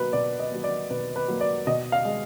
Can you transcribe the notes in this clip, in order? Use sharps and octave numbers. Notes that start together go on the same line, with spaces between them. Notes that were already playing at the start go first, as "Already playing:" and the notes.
Already playing: B2 F#3 A#3 B4
B2 D5
D#5
F#3 A#3
D5
B2 B4
B4
F#3 A#3
D5
B2 D#5
F5
G#3